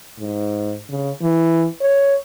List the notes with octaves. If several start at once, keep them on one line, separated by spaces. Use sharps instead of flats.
G#2
C#3
E3
C#5